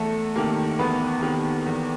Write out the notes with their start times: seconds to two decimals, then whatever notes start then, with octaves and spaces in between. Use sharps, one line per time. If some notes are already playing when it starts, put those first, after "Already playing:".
Already playing: E2 A3 A4
0.36 C3 D#3 A#3 A#4
0.79 E2 B3 B4
1.22 C3 D#3
1.66 E2